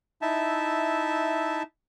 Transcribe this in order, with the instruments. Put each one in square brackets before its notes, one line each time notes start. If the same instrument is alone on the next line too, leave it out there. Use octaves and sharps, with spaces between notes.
[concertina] D#4 E4 E5 A5